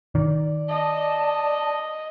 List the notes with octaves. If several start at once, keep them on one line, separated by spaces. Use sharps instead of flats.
D#3 D5
D#5 A5